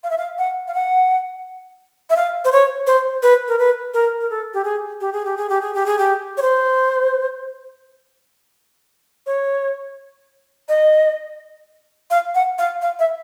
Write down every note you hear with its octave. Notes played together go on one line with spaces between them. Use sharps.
F5
E5
F5
F#5
F5
F#5
E5
F5
C5
C#5
C5
B4
A#4
B4
A#4
A#4
A4
G4
G#4
G4
G#4
G4
G#4
G4
G#4
G4
G#4
G4
C#5
C5
C#5
D#5
F5
F#5
F5
F5
E5